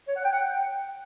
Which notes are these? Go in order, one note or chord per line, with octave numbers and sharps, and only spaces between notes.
C#5
F#5
G5
F#5
G5